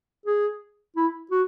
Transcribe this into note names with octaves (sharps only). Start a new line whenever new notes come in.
G#4
E4
F#4